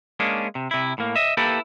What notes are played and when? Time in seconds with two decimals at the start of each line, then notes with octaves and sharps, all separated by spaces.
0.20 G#3 A#3 C#4 D4
0.55 C3
0.71 C3 E4
0.98 A2 A#3
1.16 D#5 E5
1.37 A#3 E4 G4 A4 B4